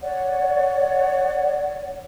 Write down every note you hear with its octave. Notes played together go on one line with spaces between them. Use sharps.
C#5 D5 F#5